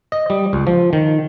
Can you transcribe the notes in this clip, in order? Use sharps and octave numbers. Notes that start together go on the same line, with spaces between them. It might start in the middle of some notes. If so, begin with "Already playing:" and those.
D#5
G3
C#2
F3
D#3